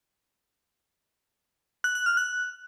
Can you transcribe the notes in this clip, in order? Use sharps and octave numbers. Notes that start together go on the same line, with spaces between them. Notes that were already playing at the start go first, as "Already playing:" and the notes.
F#6
F#6
F6
F#6